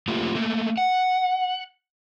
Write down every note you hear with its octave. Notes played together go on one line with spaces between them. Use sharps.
A3 A#3 F4 G4
A3 A#3
F#5